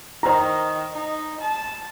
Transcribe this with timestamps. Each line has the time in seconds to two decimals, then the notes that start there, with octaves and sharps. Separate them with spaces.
0.23 D#3 C5 A#5
0.94 D#4
1.41 A5